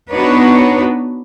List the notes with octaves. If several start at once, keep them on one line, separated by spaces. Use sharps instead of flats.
B3 D4 D#4 F#4 B4 C#5